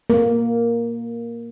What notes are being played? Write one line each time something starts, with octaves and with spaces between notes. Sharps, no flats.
A#3